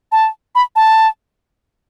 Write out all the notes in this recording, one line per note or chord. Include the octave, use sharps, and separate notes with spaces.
A5
B5
A5